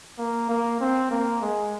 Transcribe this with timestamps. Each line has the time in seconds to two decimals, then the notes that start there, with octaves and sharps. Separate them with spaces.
0.19 A#3
0.49 A#3
0.81 C4
1.11 A#3
1.42 G#3